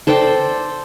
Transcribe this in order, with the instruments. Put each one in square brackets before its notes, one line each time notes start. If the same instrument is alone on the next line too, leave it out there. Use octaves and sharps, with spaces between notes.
[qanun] A4 C5 D5 G5